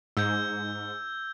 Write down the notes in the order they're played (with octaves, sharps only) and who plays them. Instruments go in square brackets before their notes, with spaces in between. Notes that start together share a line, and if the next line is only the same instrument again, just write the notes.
[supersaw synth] G#2 [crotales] E6 G6